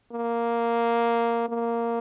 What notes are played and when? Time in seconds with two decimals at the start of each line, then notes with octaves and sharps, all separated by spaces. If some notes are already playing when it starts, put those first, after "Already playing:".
0.12 A#3
1.49 A#3